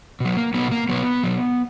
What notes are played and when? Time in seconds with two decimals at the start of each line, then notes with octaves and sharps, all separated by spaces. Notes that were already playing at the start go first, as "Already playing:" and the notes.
0.20 B2 F#3
0.37 A#3
0.54 B2 F#3 B3
0.71 A#3
0.89 B2 F#3 B3
1.23 B2 F#3